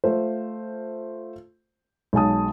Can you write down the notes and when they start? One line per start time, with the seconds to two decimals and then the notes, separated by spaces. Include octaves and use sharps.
0.04 A3 F4 C5
2.13 B1 G#3 A5 D#6